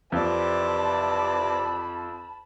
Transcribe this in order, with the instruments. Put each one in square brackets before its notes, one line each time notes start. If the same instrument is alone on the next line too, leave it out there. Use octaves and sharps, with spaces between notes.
[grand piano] F2 [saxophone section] C3 E3 D5 [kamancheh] A5 B5